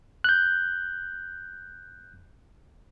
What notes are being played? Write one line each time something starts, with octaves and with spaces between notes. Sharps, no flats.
F#6 G6